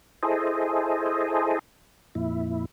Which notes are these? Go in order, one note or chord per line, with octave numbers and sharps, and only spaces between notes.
E4 G#4 A4 C5 D#5
F2 A#2 E4